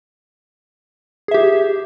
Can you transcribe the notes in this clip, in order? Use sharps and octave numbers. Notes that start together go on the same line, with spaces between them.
G4 G#4 E5